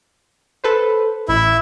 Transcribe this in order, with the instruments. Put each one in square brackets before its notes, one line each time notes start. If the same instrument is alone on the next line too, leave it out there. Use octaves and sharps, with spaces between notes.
[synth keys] A4 B4 C5
[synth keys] A1 [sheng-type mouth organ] E4 E5